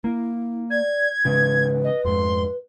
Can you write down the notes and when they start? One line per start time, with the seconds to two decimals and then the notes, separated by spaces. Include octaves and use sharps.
0.04 A#3 E4
0.70 D5 G#6
1.25 G#2 C#3 E3 B4
1.84 D#5
2.05 F2 G#2 C6